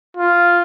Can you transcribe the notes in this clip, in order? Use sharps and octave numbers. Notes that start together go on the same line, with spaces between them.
F4